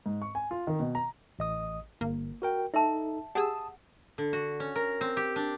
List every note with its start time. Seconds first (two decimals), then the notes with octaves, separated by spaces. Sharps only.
0.06 G#2
0.22 C#6
0.35 G#5
0.51 F4
0.67 D#3
0.80 B2
0.95 A#5
1.39 A1 D#5 D#6
2.01 G1 A#3
2.42 F#4 A#4 G5
2.74 D#4 A4 E5 A5
3.35 G4 G#4 F#5 A5 D#6 E6
4.18 D3
4.33 F#4
4.60 C#4
4.76 A#4
5.01 C4
5.17 G4
5.36 D4